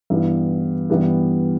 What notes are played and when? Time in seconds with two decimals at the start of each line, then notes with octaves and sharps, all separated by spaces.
0.10 G2 E3 G3 B3 E4
0.90 G2 E3 G3 B3